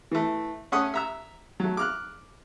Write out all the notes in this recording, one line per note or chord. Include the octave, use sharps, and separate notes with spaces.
E3 A3
A3 C#4 F#5 C#6 D#6
E5 A#5 E6
F#3 A3
D6 F6 F#6